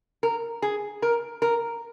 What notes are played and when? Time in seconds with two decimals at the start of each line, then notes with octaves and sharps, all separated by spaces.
0.23 A#4
0.62 G#4
1.02 A#4
1.42 A#4